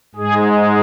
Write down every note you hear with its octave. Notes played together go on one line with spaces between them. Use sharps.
G#2 G#3 G#4